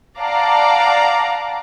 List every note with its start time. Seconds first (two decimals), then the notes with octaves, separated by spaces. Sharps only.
0.18 D5 F5 F#5 A5 A#5 D6